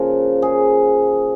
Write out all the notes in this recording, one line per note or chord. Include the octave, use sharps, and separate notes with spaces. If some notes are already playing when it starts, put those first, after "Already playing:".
Already playing: C#3 F3 A#3 A#4
G#4